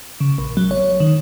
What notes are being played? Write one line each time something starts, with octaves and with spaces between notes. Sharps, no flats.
C#3
A#1
F#3
C#5
D#3